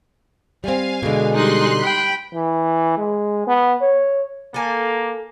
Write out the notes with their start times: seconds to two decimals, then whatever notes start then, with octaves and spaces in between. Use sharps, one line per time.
0.64 G3 C4 F5 G#5
1.02 B2 D3 G#3
1.35 G3 D#4 C6 F#6
1.80 G5 B5
2.33 E3
2.97 G#3
3.47 B3
3.81 C#5
4.54 A#3 A4 G#5